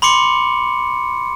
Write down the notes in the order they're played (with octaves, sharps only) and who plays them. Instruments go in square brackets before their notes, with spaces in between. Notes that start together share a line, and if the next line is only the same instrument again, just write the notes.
[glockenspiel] B5 C6 D6 C#7